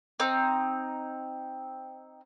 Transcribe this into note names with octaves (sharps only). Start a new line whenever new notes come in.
C4 D#4